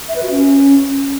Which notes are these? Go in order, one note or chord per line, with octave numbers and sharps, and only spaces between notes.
E5
B4
F#4
C#4